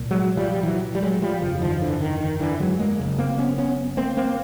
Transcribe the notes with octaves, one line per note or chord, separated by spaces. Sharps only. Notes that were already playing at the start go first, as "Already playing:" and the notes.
Already playing: C2 A#2
F#3 G#3
F3 G3
G3
E3 F#3
G3
F#3 G#3
G#3
F3 G3
G1 F2 C#3 F3
D#3 F3
D3 E3
D#3
D#3
D3 E3
F#3 G#3
G#3 A#3
F#1 F2 C#3
A#3 C4
B3 C#4
B3 C#4
A#3 C4
A#3 C4